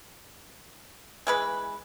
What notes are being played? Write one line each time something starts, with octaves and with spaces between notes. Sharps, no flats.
E3 G#3 B4